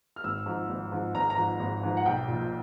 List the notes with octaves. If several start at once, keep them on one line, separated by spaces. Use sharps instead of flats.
F6
G#1 E6
G#2 F3
G#1
G#2 F3
G#1 A#5
A#5
G#2 F3
G#1
G#2 F3
F#5
B1 G5
A#2 F3